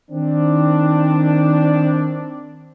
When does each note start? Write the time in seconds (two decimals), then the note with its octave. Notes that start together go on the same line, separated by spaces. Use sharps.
0.11 D#3 C4 D4